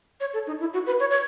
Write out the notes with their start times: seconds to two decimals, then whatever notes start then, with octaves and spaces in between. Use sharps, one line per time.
0.20 C#5
0.34 A4
0.47 D#4
0.60 E4
0.74 F#4
0.86 B4
1.00 C#5
1.11 C#5